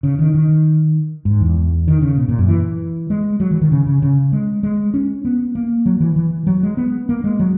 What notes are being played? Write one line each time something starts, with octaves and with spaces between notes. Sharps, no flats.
C#3
D#3
D#3
G#2
E2
D#3
C#3
B2
A#2
F#2
E3
G#3
F#3
E3
D#3
C#3
C#3
C#3
G#3
G#3
C#4
B3
A#3
F#3
E3
E3
F#3
G#3
B3
A#3
G#3
F#3